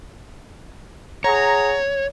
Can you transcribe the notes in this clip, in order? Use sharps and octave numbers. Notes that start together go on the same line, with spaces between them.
G#4 C#5 F#5 A#5